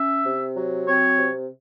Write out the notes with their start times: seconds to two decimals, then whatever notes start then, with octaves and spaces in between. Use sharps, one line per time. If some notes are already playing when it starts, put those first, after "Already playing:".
Already playing: C#4 E5
0.24 C3
0.56 F#3
0.87 C4 C#5
1.19 C3